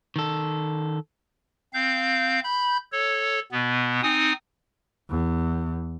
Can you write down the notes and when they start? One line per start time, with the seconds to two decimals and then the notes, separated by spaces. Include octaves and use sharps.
0.16 D#3 A4
1.73 C4 F5 G6
2.44 B5 G6
2.92 A4 C#5
3.52 B2 B3
4.02 C4 D#4 G#5 D#6
5.10 E2